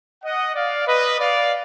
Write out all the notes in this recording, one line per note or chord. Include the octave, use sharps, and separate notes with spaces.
D#5 F#5
D5 F5
B4 D#5
D5 F5